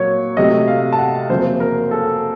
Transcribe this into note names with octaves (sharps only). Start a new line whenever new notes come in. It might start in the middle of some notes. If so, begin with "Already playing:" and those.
Already playing: A#2 F#3 A#3 C#5
C3 F#3 A3 D#5
F5
A5
F#5
F2 C#3 F#3 A#3 C5
A#4
A4